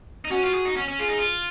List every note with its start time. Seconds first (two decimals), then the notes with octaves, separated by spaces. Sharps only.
0.25 D#4
0.31 C#4 F#4
0.43 F4
0.54 G#4
0.65 D#4
0.77 C#4
0.88 C#4
0.99 F4 G#4
1.08 D#4
1.18 F4